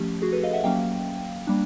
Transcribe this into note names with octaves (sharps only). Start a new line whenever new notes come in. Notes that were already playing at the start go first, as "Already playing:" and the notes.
Already playing: F3 A3 C#4 G4
F#4 G#4
A4 B4
D#5 F5
E5 F#5
F#3 A#3 C#4 F5 G5
G3 A#3 D4